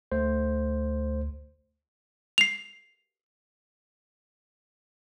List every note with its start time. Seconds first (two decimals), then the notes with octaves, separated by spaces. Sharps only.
0.12 D2 A3 C5
2.38 C7 F7